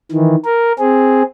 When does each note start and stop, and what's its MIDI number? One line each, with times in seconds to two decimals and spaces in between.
0.11 0.35 51
0.11 0.35 52
0.45 0.72 70
0.79 1.22 60
0.79 1.22 68